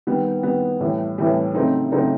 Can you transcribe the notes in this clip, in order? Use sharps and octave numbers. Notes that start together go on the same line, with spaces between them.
D#3 G3 B3
D#3 G3 B3
A2 E3 G3
A2 E3 G3
C#3 F#3 A3 C4 D#4
C#3 F#3 A3 C4 D#4